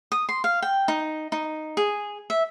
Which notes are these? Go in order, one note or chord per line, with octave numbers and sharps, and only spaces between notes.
D#6
C6
F5
G5
D#4
D#4
G#4
E5